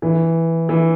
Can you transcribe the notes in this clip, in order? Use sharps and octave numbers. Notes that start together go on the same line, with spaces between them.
E3
E3